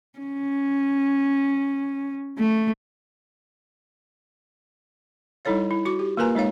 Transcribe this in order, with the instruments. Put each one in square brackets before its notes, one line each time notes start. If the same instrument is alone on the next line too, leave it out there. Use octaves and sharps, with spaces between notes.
[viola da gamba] C#4
A3
[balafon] G3 D#4 E4 A4 C#5 F5
E4
F#4 D6
G4
A#3 F4 A#4 B4 G#5 A#5
G#3 D#4 C#5 F5